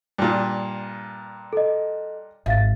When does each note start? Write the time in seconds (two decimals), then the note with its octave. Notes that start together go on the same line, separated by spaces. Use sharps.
0.18 G2 A#2
1.53 A4 D#5
2.46 G#1 E5 F5 A6